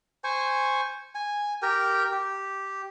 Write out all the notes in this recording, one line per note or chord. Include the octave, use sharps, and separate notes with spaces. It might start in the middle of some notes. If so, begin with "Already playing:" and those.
C5 G#5 C#6
G#5
G4 A#4 G5
G4